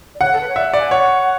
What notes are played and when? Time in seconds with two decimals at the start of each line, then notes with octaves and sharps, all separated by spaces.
0.14 D5
0.21 C#5 F#5
0.32 A4
0.40 B4
0.48 C#5
0.56 D5 E5
0.68 F#5
0.73 D5
0.79 G#5
0.91 C#5 F#5